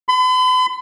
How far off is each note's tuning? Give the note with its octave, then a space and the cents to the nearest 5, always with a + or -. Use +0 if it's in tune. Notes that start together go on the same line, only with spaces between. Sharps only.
B5 +45